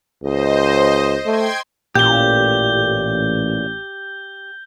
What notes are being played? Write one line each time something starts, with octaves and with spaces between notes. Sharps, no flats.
C#2 C5 D#5
A3 G5 C6 G#6
A1 A#2 G4 G6 G7